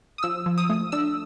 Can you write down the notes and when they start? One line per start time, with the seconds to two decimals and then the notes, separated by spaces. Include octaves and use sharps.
0.18 D#6
0.23 F3 E6
0.46 F3
0.58 D#6
0.70 A3
0.92 D4 E6